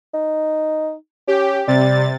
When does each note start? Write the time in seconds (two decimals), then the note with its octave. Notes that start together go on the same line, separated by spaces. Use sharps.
0.14 D#4
1.28 C#4 G4
1.68 C3 G3 A6